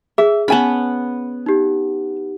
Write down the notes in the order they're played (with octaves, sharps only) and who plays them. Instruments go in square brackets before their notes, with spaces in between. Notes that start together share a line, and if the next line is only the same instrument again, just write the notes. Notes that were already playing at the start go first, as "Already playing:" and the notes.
[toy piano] G#4 [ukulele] E5
[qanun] B3 B5 [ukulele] C#4 G#5 A5
[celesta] D#4 G4